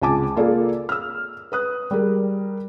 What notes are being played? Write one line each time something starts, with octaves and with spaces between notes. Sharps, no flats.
C#2 C3 G#5 A5 D6
A#3 F4 G#4 A4 D5
E6 F6
B4 D#6 F#6
G3 G#4 A#4